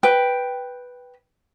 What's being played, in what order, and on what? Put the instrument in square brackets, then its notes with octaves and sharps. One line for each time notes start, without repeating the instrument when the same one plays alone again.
[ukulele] B4 G5